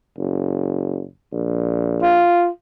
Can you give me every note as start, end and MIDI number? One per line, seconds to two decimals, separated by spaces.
0.18 1.03 30
1.32 2.24 34
2.02 2.48 65